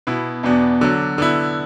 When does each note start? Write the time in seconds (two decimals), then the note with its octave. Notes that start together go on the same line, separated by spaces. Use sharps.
0.07 B2 B3 E4
0.43 E2 B2 B3 D4
0.81 D3 F#3 D4
1.18 D3 B3 E4